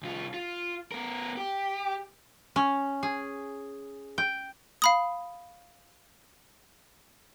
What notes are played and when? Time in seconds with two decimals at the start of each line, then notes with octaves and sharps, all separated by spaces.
0.03 C2 F4
0.34 F4
0.92 B3 A#4
1.37 G4
2.56 C#4
3.03 G#4
4.18 G5
4.82 F5 B5 D#6